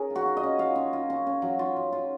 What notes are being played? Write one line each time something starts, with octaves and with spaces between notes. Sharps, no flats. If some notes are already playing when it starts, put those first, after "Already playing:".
Already playing: C#4 G#4 A#4
F4
F#4
F4
D#5
C#4
F4 F5
C#4
F4
C#4
C#4
F#3
F4
F#3
F4